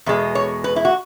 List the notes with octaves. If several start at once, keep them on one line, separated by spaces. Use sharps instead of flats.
E2 B2 G#3
C#5
B4
E4
F#4